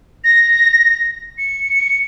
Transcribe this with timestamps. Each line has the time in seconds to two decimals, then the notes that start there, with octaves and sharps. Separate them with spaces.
0.24 A#6
1.38 C#7